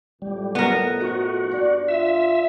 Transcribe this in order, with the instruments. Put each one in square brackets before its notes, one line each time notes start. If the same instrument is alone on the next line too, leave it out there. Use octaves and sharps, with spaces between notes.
[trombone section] F2 A2 [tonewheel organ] G3
[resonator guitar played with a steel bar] B3 A#4
[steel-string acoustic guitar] F3 G#3 D#4 [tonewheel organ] F#4
[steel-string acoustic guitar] G2 D4 D5
[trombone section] F4 [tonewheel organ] E5